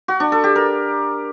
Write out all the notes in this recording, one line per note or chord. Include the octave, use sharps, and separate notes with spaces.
F#4
D4
A4
G4
A#4